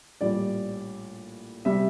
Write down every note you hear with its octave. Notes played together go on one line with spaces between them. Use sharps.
A#1 A2 G3 D5
C3 G3 E5